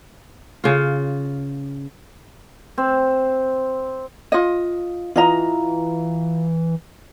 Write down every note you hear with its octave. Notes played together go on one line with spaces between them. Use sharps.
C#3 F4
C4
F4 D#5
E3 F4 D#5 A#5